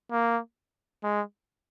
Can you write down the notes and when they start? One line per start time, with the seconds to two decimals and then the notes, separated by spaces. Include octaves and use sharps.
0.12 A#3
1.04 G#3